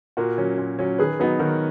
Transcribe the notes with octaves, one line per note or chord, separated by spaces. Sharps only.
A#2 F#4 A#4
F#3 C#4
A#2
F#3 C#4
D#3 G#4 B4
F#3 B3 D#4
D#3 F#4 A#4